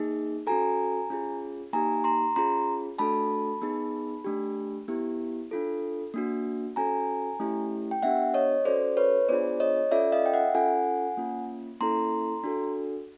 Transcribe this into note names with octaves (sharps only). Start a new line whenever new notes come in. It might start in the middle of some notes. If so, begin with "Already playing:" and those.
Already playing: A#3 D#4 G#4
C#4 F#4 A4 G#5 A#5
C#4 F4 G#4
A#3 D#4 G4 G#5 A#5
A#5 C6
C#4 F4 G#4 A#5 C6
A3 D4 F#4 A4 A5 B5
B3 D#4 G#4
A3 D4 G4
B3 E4 G4
D4 F4 A4
A#3 D4 F#4
C#4 F#4 A4 G#5 A#5
A3 C#4 E4 G4
G5
B3 D4 G4 E5 F#5
C#5 D#5
C#4 F#4 A4 C5 D5
B4 C#5
B3 D4 F4 G#4 C5 D5
C#5 D#5
C#4 F4 A4 D5 E5
D#5 F5
G5
E5 F#5
C#4 F4 A4 F#5 G#5
A#3 C#4 F4
A#3 C#4 E4 A4 A#5 C6
D4 F#4 A4